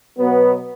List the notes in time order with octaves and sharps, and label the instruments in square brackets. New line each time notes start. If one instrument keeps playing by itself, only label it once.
[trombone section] B2 F#3 B3